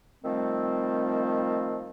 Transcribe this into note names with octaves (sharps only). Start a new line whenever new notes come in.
D#3 F3 G3 A3 C4